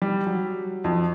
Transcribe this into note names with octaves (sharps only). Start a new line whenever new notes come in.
G3
F#3
F2